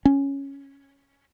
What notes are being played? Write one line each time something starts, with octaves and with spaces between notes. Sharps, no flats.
C#4